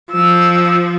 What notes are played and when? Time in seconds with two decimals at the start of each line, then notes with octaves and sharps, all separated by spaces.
0.12 F3 E6